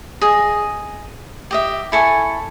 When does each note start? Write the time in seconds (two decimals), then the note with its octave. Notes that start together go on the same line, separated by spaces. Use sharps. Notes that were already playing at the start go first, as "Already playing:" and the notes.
0.21 G#4 D#5
1.51 G4 D#5 E5
1.92 E4 A4 G#5 C#6